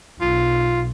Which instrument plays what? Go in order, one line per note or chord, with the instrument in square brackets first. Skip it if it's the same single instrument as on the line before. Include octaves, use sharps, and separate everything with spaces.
[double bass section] B1 [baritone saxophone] F4